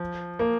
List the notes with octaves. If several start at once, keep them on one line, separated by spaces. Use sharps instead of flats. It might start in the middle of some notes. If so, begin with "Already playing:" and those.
Already playing: F3
A#3